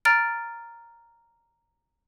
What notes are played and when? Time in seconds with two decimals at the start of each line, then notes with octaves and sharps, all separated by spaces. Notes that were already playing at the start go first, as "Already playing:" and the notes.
0.05 A#5 F6 A6 D7